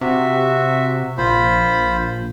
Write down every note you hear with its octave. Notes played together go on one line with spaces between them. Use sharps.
C3 F#4 E5
A#1 F4 C5 B5